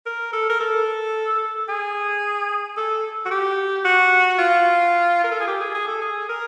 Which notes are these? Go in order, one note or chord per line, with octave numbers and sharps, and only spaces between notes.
A#4
A4
A#4
A4
G#4
A4
F#4
G4
F#4
F4
A#4
A4
G#4
G4
G#4
G#4
A4
G#4
A#4